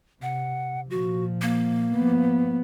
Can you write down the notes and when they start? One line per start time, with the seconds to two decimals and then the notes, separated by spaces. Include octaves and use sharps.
0.22 C3 F#5
0.90 A#2 F3 F#4
1.42 A#3
1.94 F3 B3